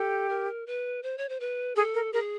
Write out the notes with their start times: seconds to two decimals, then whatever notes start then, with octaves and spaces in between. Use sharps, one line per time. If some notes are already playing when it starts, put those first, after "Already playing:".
Already playing: G4 A4
0.29 A#4
0.67 B4
1.03 C5
1.18 C#5
1.29 C5
1.40 B4
1.76 G#4 A4
1.94 A#4
2.13 G#4 A#4